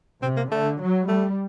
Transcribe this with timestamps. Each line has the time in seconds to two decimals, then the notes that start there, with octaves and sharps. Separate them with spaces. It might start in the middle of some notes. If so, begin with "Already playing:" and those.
0.23 C3 C4
0.37 A#3
0.51 D3 A3
0.80 F#3
1.08 G3 A3